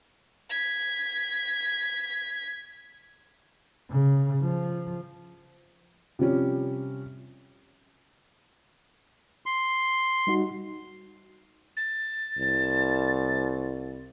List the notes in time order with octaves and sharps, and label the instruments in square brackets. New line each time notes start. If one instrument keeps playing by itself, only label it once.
[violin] G#6 B6
[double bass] C#3
F3
[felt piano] C3 F3 G3 C#4
[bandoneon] C6
[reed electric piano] G3 D#4 F#4
[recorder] A6
[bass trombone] C2